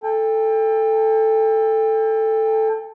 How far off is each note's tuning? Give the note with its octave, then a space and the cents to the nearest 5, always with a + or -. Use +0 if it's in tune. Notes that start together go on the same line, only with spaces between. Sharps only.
A4 +0 G5 +35